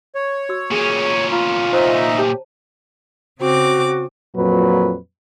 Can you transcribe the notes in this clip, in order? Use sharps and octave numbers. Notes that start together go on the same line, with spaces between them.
C#5
F#4 E6
A#2 C#4 G#4
F4 A#5 B5
D#4 C5 D#5 E5 A#5
G4 A5
C#3 C4 F#4 D6
F2 A#2 F#3 B4